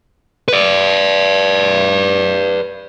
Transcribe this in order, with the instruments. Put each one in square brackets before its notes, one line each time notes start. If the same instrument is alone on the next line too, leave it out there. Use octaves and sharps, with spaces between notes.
[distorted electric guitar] B4 D5